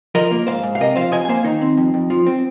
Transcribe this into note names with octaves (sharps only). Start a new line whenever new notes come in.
F3 A#4 D#5
A#3
G#2 C5 F5
G#2
F5
C3 A#4 D#5
F3 C5 F5
F2 D#5 G#5
G#5
A#3 C5 F5
D#3 D#4
C4
F2
F2
F3
C4